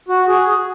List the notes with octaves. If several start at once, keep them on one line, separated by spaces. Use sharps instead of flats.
F#4
G#4